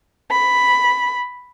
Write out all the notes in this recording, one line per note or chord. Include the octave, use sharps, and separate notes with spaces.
B5